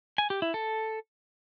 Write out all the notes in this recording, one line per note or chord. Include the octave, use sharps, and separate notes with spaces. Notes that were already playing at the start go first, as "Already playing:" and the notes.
G#5
G4
E4
A4